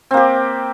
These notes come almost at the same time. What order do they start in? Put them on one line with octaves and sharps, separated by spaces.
C4 A#3 G4